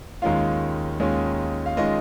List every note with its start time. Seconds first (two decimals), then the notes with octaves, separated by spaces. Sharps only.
0.22 D#2 D#3 G#3 C#4 F4 F5
1.00 D#2 D#3 G#3 C#4 F4
1.66 F5
1.77 D#3 G#3 C#4 F4 D#5